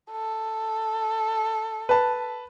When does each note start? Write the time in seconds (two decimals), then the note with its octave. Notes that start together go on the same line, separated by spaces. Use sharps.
0.11 A4
1.89 B4 A5